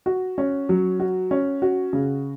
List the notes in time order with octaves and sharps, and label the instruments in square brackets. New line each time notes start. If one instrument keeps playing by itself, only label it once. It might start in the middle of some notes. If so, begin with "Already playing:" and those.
[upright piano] F#4
C#4
F#3
F#4
C#4
F#4
C#3